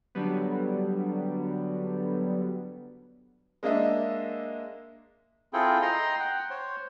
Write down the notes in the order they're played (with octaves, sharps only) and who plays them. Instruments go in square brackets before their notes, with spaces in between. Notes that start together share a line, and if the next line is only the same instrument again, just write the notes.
[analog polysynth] D3 F#3 G3 B3
[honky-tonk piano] G#3 A#3 D4 D#5 E5
[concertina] C4 E4 F4 G#4 A4 G5
D#5 G5 A#5 C6
F#5 G5
C5 C#5